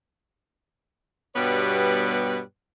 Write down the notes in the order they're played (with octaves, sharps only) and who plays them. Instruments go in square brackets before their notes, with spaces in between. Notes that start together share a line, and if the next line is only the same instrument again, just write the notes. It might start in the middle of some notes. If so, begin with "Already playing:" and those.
[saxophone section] G2 B2 G3 B3 B4 C#5